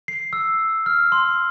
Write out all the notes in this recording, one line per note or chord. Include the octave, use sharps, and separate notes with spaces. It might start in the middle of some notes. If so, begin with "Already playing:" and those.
C7
E6
F6
C6